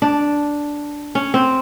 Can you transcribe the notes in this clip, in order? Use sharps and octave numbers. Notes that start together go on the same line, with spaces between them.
D4
C#4
C4